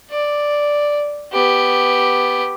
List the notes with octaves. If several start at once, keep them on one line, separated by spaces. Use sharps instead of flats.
D5
B3 G4